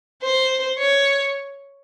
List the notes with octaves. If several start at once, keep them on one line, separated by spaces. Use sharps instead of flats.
C5
C#5